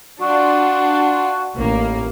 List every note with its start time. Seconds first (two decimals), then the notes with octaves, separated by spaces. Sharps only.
0.21 D4 F4 F#4
1.55 A1 A#3